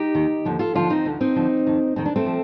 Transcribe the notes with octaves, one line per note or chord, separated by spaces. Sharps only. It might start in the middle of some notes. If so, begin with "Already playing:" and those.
Already playing: D#4 G4
D#2 D#3
D#2 D3 F3
F4 A4
D#2 D3 F3 D4 F4
C4 D#4
D2 D3 F3
C4 D#4
D2 D3 F3
F2 D#3
F2 D#3 C4
D4
A3 C4
F3